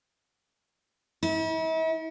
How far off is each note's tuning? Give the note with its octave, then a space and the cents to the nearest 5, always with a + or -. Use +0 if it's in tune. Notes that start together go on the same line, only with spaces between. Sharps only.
E4 -45